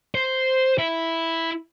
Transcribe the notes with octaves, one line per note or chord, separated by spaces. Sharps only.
C5
E4